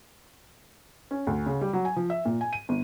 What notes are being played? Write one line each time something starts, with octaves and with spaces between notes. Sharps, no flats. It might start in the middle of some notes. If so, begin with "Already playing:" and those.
C#4
D2
C#3
G3
F#3
G#5
F3
E5
A#2
G#5
D#7
G1